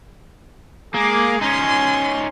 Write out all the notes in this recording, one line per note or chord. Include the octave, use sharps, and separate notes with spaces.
G#3 A#3 G#4 D6
C#4 D#4 G#5 C6